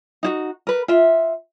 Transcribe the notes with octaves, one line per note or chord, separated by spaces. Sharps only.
D#4 E4 F#4
A#4 B4
F4 E5